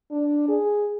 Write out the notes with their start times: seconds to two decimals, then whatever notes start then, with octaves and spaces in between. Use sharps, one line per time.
0.11 D4
0.49 G#4